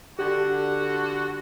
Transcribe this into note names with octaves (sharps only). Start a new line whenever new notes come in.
D3 F#4 G4